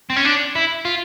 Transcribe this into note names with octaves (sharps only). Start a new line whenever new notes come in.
C4
C#4
D4
E4
F4